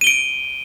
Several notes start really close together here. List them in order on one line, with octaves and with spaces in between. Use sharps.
D#7 G7 D7